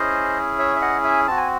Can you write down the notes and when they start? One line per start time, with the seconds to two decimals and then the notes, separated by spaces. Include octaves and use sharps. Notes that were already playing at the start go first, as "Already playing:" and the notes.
Already playing: C#4 E4 G#4 C5 D#5
0.59 C#5 E5
0.76 E5
0.82 D#5 F#5
1.04 E5 G#5
1.27 C4 F#4 A5
1.37 G#5